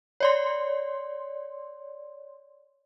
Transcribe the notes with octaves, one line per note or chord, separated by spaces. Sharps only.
C#5 D5 C6